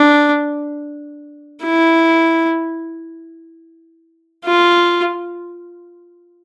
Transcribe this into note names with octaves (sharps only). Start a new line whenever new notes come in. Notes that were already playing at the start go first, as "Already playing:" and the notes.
Already playing: D4
E4
F4